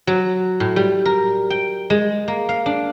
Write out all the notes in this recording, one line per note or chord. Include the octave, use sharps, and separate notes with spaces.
F#3
A2
G3
A#4
G5
G#3
A#3
F5
D4